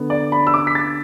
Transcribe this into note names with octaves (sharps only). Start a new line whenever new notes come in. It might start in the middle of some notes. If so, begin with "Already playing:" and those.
Already playing: D3 B3
D5
B5
E6
D6
B6
A6